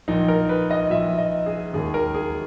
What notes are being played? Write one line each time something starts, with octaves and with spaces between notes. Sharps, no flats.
A#1 A#2 D#4
A#4
B4
D#5
A#1 A#2 E5
D#5
G#4
E1 D#2 D#3 G#4
A#4
G#4